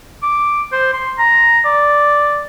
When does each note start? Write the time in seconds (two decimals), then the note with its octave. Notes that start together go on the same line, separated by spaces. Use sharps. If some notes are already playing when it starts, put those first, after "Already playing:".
0.23 D6
0.72 C5
0.93 C6
1.18 A#5
1.65 D5